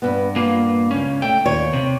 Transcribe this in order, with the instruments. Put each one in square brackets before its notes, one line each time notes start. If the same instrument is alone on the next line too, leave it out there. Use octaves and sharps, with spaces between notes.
[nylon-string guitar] G2 B3
[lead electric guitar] A#3 F4
C#2 C#4
[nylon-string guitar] A3 [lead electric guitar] G5
[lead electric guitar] D#2 [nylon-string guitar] C#5
[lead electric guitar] C3